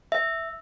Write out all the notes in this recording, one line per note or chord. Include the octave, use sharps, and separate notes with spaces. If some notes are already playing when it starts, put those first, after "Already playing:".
E5